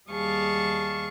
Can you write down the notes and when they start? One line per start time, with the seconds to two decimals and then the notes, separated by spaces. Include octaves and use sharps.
0.10 D#2 G3 G#4 F5 A5 C#6